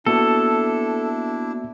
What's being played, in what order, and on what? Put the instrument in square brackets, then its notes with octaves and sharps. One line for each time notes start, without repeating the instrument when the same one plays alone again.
[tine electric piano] A#3 B3 F#4 [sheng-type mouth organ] D4 E4 [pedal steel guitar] A4